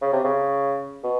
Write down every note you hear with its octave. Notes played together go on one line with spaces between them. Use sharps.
C#3
C3
C#3
B2